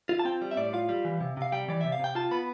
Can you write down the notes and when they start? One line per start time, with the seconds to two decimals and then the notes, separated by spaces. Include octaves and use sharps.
0.09 F4
0.19 A5
0.25 C4 G5
0.42 G3
0.51 E5
0.57 A2 D5
0.73 F4 F5
0.89 G3
1.05 E3
1.20 C3
1.37 C3 F5
1.52 G3 G5
1.68 E3 D5
1.81 C3 E5
1.92 F5
1.99 C3 G5
2.15 F4 A5
2.31 B3 B5